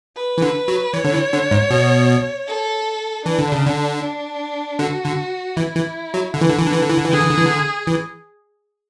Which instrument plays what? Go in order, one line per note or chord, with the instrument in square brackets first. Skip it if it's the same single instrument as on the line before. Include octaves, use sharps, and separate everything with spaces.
[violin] B4
[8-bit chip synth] E3
D3
F#3
[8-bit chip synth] E3 [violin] C#5
[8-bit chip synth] D3
E3
D3
G#2
B2
[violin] A4
[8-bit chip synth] E3 [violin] D4
[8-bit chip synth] D3
C#3
D3
[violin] D4
[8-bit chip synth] D3 [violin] F#4
[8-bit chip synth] D3
[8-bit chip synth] E3 [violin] E4
[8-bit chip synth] E3
F#3
D3
E3
D3
E3
D3
E3
D3
E3
D3
E3
[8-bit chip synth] D3 [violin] G#4
[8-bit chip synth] E3
D3
E3
D3
E3